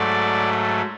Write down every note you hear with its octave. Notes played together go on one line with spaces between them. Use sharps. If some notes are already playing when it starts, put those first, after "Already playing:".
Already playing: G#2 F#3 A3 D5